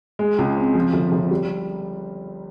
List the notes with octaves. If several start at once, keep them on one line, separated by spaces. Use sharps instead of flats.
G#3
C#2
C4
F3
G1
G1
G3